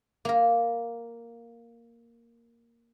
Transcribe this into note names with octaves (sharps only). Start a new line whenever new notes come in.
A#3 A#4